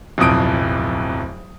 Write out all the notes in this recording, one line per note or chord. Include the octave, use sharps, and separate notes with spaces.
D1 B1 F2 D#6 D7